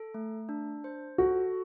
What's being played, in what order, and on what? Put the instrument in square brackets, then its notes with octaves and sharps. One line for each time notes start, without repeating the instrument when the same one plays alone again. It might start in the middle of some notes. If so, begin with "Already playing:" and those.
Already playing: [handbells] A4
A3
D4
C5
[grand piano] F#4 [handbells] A4